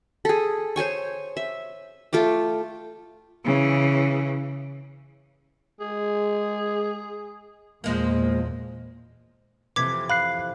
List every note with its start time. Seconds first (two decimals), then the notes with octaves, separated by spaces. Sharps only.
0.25 G#4 A4
0.76 C5 C#5 G#5 C#6
1.37 E5
2.13 A3 F4 G5 D6
3.45 C#3 E3
5.81 G#3 G#4
7.84 E2 A#2 F3 G#3 A#3
9.76 F2 C3 E3 D6 G#6 B6
10.10 F5 B5 F#6 C7